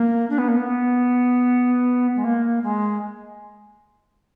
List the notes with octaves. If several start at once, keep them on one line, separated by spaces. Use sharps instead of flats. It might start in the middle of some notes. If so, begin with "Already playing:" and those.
Already playing: A#3
D4
B3
A#3
B3
G#3
A#3
G#3